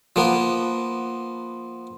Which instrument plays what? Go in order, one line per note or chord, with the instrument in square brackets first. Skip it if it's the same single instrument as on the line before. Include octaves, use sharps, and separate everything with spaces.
[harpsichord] F3 A#3 B3